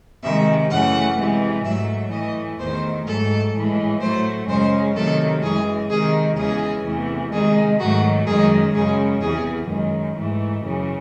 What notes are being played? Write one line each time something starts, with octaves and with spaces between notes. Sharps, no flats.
C3 D#3 G#3 E5
F#2 C#3 E3 A3 F#5
C3 E3 G#3
G#2 F#3 A3 E5
A2 E3 A3 D#5
E2 D#3 A3 C5
G#2 F#3 A3 A4
A2 E3 G#3
A2 F#3 A3 C5
F#2 C#3 G#3 C5
C3 D#3 F#3 A3 A4
F#2 E3 G#3 G#4
C3 D#3 G#3 G#4
E2 C#3 E3 G#3 G#4
E2 C3 E3 A3
C3 D#3 G#3 G#4
G#2 D#3 F#3 A3 F#4
F#2 D#3 G#3 G#4
F#2 C#3 G#3 G#4
E2 C3 E3 G#4
F#2 D#3 G#3
G#2 E3 A3
F#2 C#3 E3